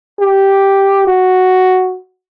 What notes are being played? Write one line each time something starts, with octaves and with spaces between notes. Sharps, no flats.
G4
F#4